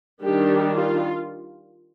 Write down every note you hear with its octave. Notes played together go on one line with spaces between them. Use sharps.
D#3 G3 D4 G4
F4